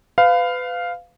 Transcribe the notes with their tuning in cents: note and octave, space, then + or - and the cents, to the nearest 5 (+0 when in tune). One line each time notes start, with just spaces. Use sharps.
B4 +30 F5 +0